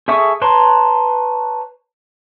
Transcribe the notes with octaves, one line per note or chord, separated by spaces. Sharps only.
G#4 A4 E5 C#6 D#6
B4 C#5 A5 A#5 C6